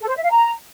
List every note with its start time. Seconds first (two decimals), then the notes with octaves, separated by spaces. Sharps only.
0.01 A4
0.09 C5
0.16 E5
0.24 F5
0.31 A#5